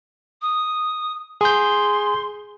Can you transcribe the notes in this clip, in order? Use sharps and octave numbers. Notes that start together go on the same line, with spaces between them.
D#6
G#4 C6 G6